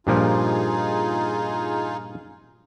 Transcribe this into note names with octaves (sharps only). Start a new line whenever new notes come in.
G2 A#2 F3 D#4 F4 G#4